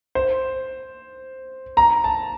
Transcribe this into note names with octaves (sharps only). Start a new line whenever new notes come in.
C5
A#5
A5